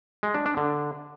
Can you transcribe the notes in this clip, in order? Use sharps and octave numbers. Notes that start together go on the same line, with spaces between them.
G#3
D4
D4
D3